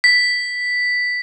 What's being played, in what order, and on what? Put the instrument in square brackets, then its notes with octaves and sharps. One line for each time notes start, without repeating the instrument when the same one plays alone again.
[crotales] B6